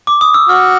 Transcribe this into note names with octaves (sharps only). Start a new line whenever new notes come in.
D6
D#6
E6
F#4 F6